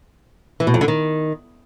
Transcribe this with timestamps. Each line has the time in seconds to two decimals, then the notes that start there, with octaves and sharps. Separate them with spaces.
0.60 E3
0.67 B2
0.74 F2
0.81 D3
0.88 D#3